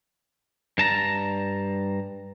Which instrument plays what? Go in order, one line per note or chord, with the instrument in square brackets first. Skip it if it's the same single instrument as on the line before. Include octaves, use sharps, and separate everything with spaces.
[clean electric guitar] G2 A5 A#5